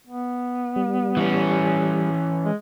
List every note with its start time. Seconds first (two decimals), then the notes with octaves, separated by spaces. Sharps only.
0.07 B3
0.76 G3
1.17 E3 C#4
2.45 G#3